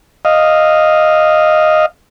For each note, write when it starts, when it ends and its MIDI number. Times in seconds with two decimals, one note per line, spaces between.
0.25 1.86 75
0.25 1.86 77